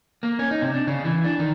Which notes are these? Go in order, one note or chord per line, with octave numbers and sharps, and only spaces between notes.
A#3
C#4
D#4
C3
D4
C#3
E3
D4
D#3